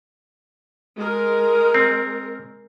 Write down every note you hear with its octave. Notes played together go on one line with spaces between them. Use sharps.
G#3 A#4
C4